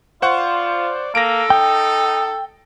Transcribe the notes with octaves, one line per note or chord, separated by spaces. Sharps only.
F4 C5 D5 F#5 C#6
A#3 A4 A#6 D7
D#4 G5